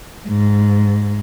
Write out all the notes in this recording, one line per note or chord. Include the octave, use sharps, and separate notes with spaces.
G#2